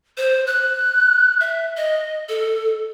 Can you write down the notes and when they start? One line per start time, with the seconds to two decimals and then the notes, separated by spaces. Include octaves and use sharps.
0.17 C5
0.47 F#6
1.40 E5
1.77 D#5
2.29 A4